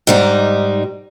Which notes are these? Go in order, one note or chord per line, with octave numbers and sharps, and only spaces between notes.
G#2 G3 D#4